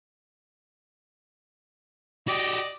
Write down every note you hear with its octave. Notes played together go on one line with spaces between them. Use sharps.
F#4 G4 D5 D#5